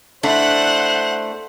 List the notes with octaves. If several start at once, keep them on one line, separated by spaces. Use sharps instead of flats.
A3 D4 E4 C5 F#5 F#6